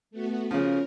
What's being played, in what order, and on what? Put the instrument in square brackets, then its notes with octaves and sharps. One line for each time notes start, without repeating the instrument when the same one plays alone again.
[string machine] A3 B3 F#4
[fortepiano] C#3 F3 [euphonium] C#4 [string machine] A#4